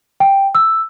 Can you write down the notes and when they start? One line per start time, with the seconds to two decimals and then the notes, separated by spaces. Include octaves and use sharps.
0.20 G5
0.55 E6